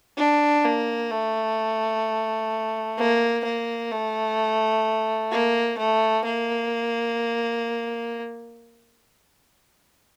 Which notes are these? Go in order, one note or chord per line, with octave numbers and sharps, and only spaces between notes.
D4
A#3
A3
A#3
A#3
A3
A#3
A3
A#3